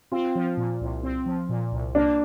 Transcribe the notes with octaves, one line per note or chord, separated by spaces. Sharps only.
C4 F4
F3
A#2
C2
C4
F3
A#2
C2
A#3 D4